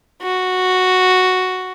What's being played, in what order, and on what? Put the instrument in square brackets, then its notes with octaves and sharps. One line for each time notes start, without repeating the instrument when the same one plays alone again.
[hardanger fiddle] F#4